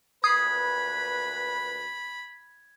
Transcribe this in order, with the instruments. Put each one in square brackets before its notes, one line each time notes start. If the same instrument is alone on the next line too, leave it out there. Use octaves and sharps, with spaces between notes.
[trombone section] D2 A#2 B4 [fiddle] B5 [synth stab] D#6 C7 [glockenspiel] G#6